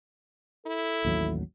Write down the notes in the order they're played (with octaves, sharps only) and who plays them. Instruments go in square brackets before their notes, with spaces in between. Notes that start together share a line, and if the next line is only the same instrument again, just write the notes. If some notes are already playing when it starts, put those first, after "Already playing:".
[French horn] E4 [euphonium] A4
[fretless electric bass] A1 D#2 F#3